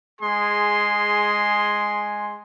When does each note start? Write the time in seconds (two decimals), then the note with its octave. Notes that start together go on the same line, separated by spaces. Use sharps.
0.21 G#3 G#4 C6